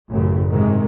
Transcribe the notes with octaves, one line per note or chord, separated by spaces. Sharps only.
A1 F#2 C#3
G#2 C3 D#3 G#3